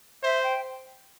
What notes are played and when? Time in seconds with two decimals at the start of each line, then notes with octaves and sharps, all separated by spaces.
0.23 C5 E5
0.43 G5